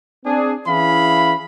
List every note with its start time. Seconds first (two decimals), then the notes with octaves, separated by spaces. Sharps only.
0.25 C4 D4 G#4
0.67 E3 C#4 E4 G#4 F5 B5